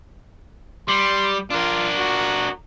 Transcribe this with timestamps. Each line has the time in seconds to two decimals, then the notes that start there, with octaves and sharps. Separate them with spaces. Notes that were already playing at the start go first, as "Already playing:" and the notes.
0.88 G3 C6
1.50 D4 F4 A#4
1.98 F#4